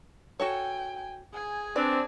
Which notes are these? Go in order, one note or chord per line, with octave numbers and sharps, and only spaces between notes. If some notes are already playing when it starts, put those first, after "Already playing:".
F#4 A4 C#5 G5 G#5
G#4 G#5
C4 D4 B4 D5